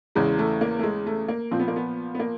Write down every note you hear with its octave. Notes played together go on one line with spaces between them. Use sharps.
E2 C#3 E3 G#3
A3
A#3
A3
G#3
A3
A#3
A#2 F3 C4
B3
A#3
B3
B3
A#3